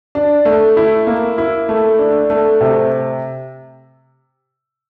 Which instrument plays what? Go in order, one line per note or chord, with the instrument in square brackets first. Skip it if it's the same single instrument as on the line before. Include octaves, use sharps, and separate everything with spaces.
[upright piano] D4
A3
E4
A#3
E4
A3
D4
A3
C3